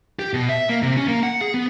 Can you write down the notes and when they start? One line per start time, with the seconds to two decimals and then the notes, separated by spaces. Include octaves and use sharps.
0.19 G4
0.33 B2
0.49 E5
0.69 A#3
0.82 C3
0.97 C#4
1.08 A#3
1.23 F#5
1.41 G#4
1.54 B3